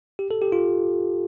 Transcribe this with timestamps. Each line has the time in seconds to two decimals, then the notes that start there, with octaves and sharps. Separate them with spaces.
0.19 G4
0.31 A4
0.42 G4
0.52 F4